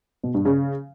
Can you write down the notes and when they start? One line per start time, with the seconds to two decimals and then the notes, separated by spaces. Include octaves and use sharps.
0.23 B2
0.34 G2
0.45 C#3